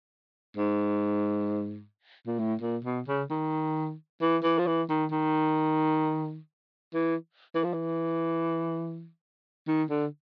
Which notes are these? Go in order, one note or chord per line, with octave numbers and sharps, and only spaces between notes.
G#2
A#2
A2
A#2
B2
C#3
D#3
E3
E3
F3
E3
D#3
D#3
E3
E3
F3
E3
D#3
D3